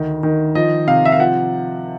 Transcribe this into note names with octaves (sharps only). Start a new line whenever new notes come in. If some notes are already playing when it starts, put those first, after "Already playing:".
Already playing: D2 D#3
D#3
F3 D#5
C3 F5
E5
F5
F3 F#5